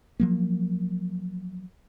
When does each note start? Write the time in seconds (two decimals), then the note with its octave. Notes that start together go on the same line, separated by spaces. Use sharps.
0.20 F3 F#3 A#3